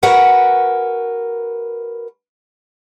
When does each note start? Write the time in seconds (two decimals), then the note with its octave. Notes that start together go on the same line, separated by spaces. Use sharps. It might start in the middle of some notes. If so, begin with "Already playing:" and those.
0.03 F#4 A#4 B4 F#5 G#5